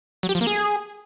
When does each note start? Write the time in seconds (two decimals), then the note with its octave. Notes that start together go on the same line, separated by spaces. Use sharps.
0.23 F#3
0.29 G4
0.35 F3
0.41 A#3
0.47 G#4